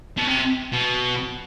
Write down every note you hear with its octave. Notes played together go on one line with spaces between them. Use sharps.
B2
C3
B2